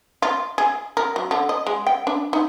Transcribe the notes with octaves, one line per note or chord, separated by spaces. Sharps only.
F4
G#4
A#4
F#3
D3
D#5
G#3
G5
D4
D#4